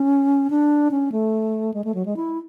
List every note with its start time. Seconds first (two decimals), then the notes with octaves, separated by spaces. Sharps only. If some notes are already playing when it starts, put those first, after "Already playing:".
Already playing: C#4
0.50 D4
0.91 C#4
1.12 A3
1.74 G#3
1.84 A3
1.95 F#3
2.06 G#3
2.16 E4